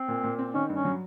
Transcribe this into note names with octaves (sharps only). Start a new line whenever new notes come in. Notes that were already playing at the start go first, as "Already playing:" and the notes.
Already playing: C4
A#2
A#2
C4
D#3 C#4
G2 C#4
F#3